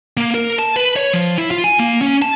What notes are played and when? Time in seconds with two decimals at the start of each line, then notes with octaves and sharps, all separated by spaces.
0.17 A#3
0.35 A#4
0.59 A5
0.76 B4
0.96 C#5
1.13 F3
1.38 E4
1.51 F4
1.64 G#5
1.79 A#3
2.02 C#4
2.22 A5